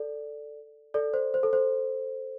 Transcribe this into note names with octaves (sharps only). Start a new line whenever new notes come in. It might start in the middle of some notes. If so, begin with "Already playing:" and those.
Already playing: A4 D5
A4 D5
C5
C5
A4
C5